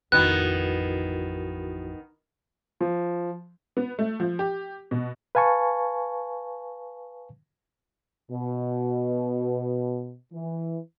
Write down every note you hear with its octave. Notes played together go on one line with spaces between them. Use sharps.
A1 F2 D#3 B3 E4 F#4 A#4 F#6
F3
B3
A3
F3
G4
B2
B4 F5 G#5 A5 C#6
B2
E3